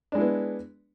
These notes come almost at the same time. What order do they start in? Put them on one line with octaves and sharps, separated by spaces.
D4 G#3 E4 B3